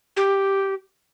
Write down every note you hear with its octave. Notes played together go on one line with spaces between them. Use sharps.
G4